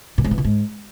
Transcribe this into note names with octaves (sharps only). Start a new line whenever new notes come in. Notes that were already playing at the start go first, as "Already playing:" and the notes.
A#2
G#2
E3
A#2
G#2